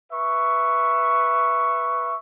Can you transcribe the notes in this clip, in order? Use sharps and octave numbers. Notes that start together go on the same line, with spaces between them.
B4 E5 C#6